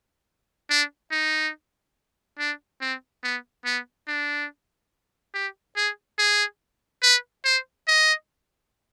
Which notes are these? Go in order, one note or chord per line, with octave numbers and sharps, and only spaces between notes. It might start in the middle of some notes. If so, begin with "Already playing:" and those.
D4
D#4
D4
C4
B3
B3
D4
G4
G#4
G#4
B4
C5
D#5